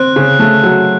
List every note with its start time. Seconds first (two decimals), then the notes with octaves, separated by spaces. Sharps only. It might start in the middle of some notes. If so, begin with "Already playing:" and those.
Already playing: C4 F#6
0.16 C#3
0.39 A3
0.63 F#3